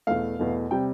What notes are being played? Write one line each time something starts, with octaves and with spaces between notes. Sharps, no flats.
E2 B2 A3 F5
E2 B2 A3
C3 G3 G5